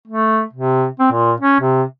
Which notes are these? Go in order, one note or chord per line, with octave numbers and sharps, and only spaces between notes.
A3
C3
C4
A#2
C#4
C3